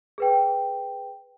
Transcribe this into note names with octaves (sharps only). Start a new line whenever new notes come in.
G#4 B4 G5